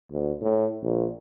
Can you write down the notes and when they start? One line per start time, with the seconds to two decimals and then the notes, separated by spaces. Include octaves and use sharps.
0.11 D2
0.41 A2
0.82 A#1